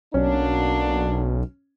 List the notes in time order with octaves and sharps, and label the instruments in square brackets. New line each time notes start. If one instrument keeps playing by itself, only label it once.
[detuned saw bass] B1 [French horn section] F#3 A#3 D4 [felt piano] C#4